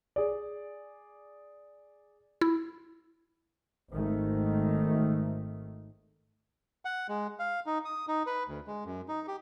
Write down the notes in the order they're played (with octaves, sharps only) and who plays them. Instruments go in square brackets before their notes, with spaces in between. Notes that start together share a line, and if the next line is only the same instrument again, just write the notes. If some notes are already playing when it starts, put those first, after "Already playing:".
[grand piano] G#4 D5
[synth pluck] E4
[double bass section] G#1 D#3 A3
[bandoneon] F#5
G#3
F5
D#4
D#6
D#4
B4
D2
G#3
F#2
D#4
G4